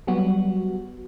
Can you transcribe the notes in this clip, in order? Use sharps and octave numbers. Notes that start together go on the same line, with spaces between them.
F#3 G3 B3 F#4